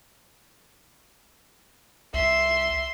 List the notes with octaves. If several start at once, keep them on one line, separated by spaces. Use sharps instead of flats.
C2 E5 C6